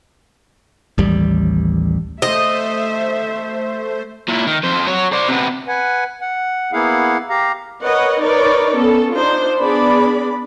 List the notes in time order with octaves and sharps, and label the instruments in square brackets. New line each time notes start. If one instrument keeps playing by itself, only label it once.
[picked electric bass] A1 D#2 G3
[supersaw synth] A3 C5 [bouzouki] D#5 [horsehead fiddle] E5
[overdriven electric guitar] A#2 E4
D#3
F2 C5
F#4 C#5
C5 D5
C3 B3
[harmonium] B4 F#5 G#5
F#5
A#3 B3 E4 G#4 F5 F#5
G4 F5 A#5
[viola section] A#4 B4 C#5 D#5 F#5
D#4 A#4 B4 C#5 D5
B3 C#4 A4
D4 D#4 F4 C5
B3 D4 G#4 D5 B5